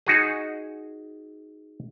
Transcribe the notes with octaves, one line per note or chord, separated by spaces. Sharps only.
D#4 F#4 G#4